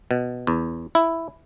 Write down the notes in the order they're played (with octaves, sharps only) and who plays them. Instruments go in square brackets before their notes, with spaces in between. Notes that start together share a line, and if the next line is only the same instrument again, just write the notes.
[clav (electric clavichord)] B2
E2
E4